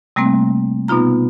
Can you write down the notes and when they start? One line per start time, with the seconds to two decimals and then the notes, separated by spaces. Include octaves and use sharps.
0.16 C3 G3 A3 A#3 C4
0.88 B2 B3 D#4 F4 A#5